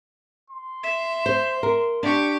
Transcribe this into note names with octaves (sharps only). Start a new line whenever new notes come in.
C6
E5
C5
A#4
D4 G4 C#6